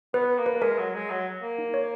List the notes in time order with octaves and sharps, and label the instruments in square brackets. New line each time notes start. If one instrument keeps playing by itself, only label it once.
[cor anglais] B3 [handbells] B4
[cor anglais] A#3
[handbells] B4
[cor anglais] G#3 [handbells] A#4
[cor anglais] F#3
G#3
F#3
A#3
[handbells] D#4
C#5